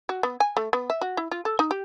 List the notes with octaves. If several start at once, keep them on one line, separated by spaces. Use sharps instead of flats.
F#4
B3
G#5
A3
B3
E5
F#4
E4
F4
A4
D#4
G4